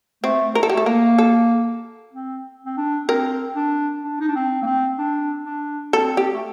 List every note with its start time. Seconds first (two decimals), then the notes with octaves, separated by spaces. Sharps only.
0.23 A3 C4
0.55 A#4
0.63 A4
0.69 G4
0.74 A3 A4
0.86 A#3 A#4
1.18 A4
2.13 C4
2.66 C4
2.77 D4
3.08 C4 A#4
3.56 D4
4.03 D4
4.20 D#4
4.28 D4
4.35 C4
4.62 A#3
4.66 C4
4.98 D4
5.45 D4
5.93 C4 A4
6.17 G4
6.34 A3